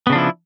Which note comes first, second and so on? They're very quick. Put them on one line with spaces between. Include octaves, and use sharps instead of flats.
B3 C#3 D4 F3 E4